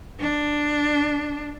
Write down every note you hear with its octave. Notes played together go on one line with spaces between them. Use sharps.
D4